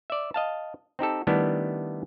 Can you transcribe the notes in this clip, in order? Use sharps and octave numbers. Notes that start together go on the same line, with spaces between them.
D5 E5
D#5 F5 A5
C4 D#4 G4 A4
D#3 G3 A3 B3 D4 E4